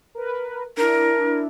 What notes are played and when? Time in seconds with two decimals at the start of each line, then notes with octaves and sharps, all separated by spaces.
0.15 A#4 B4
0.77 D4 E4 A#4